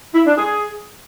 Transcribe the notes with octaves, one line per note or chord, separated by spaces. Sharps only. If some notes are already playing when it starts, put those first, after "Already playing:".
E4
D4
G#4